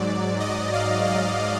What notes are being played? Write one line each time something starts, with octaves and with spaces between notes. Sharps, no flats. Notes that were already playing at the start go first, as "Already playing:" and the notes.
Already playing: G#2 F#3 D5
D#5
F5
F5